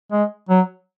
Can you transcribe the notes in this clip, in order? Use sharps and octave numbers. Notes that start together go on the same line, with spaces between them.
G#3
F#3